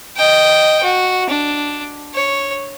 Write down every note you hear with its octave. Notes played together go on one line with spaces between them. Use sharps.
D#5 G5
F#4
D4
C#5